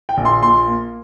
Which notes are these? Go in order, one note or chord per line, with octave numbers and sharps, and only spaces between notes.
G5
A#1
C6
A#2 C6
A#3